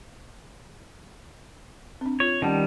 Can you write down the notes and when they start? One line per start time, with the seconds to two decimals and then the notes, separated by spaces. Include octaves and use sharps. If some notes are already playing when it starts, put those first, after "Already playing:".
2.01 C4 D4
2.20 F4 C#5
2.42 D#3 G3 C#4 F#5 A5